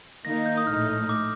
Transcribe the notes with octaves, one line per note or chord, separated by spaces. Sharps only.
D#3 A#3 D#4 A#6
G6
D#6
A#1 A2 A3 D#4 F6
D6